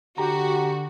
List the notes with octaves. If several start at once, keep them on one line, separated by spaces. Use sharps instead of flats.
D3 F#4 G4 A#5